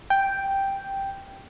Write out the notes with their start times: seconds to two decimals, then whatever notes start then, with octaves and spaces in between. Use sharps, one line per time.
0.10 G5